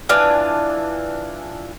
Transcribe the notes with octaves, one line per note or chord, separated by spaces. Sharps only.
E3 D4 F4 G#5